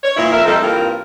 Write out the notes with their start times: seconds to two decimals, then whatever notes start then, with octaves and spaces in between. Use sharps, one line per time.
0.03 C#5
0.17 A#2 E3 A#3 E4
0.32 F2 A#4 E5
0.46 G3 A#3 C4 D#4 A4
0.62 G2 E3 A#3 C4 F4 A#4